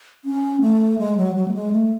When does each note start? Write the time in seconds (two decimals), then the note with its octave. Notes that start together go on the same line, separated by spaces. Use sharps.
0.25 C#4
0.61 A3
0.99 G#3
1.17 F#3
1.36 F#3
1.48 A3
1.54 G#3
1.72 A3